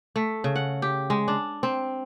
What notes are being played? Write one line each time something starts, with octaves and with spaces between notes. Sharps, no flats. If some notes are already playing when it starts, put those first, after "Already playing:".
A3
C#3
F#5
G4
G#3
D4
C4